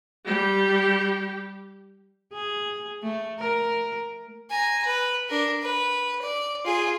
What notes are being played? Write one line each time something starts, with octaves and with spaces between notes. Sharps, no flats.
G3 G4
G#4
A3
A#4
G#5 A#5
B4
D4 A#4
B4
D5
F4 G#4